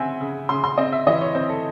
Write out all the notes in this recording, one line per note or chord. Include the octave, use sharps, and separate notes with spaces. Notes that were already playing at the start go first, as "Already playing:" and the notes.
Already playing: C#3 C4 E5 F#5 G#5
C#3
C#3 C6
C6
C4 D#5
E5
E3 D#5
C#5
C4 C5
A4